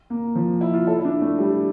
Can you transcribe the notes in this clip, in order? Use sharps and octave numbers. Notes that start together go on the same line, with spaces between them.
A#3
F3
E4
F4
A4
E4
D4
A3
G3